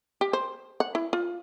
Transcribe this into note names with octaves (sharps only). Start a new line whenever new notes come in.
G4
C5
F#5
E4
F4